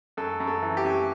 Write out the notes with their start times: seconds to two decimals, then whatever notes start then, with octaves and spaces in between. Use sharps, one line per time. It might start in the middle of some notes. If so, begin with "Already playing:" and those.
0.17 F#2 A4
0.40 F#2
0.47 A4
0.62 E3
0.77 G4
0.85 F#2